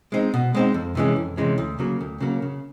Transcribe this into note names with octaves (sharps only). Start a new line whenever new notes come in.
G#3 C4 D#4
B2
G#3 C4 D#4
F2
C3 E3 G#3 C#4
F2
C3 E3 G#3 C#4
D2
C#3 F#3 A#3
D2
C#3 F#3 A#3
C#3